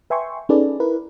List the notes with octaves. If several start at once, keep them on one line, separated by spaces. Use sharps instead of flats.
B4 E5 G5 G#5 C6 C#6
C#4 D#4 G#4 A4 B4 D5
E4 A#4 B4